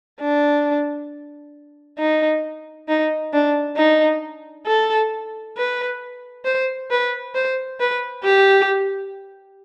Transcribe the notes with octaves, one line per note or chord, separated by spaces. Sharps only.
D4
D#4
D#4
D4
D#4
A4
B4
C5
B4
C5
B4
G4